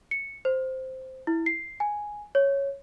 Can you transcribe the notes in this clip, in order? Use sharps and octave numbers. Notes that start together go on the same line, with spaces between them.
C#7
C5
E4
C7
G#5
C#5